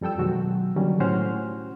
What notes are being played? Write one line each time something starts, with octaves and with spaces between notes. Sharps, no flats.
F2 G3 A4 G5 E6
B2 D#3 F#3 G#3 F#4
D3 D#3 F#3 G3 A#3 C#4
A2 C#4 F#4 C5 F#5 F6